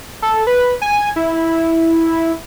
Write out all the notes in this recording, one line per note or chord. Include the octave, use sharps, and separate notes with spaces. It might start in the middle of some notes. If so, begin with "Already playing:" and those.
A4
B4
G#5
E4